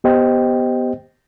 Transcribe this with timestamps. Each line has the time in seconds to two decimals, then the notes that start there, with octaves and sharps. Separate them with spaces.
0.04 B3 G4 C5 D#5 G5